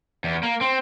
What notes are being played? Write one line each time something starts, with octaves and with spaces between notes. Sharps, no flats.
E2
A#3
C4